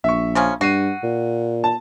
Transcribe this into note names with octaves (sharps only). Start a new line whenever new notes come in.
A#1 E5 C#6
C#3 F3 C#4
G2 F#4 C7 D#7
A#2
A5